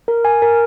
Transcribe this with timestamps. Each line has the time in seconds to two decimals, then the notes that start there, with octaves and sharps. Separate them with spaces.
0.08 A#4
0.25 G#5
0.42 A#4